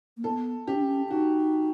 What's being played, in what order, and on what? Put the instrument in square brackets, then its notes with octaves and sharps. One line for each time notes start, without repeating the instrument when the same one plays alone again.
[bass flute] A#3
[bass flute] B3 [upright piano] A4
[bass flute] C#4 [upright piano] G4
[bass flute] D4
C#4
[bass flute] D#4 [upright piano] F#4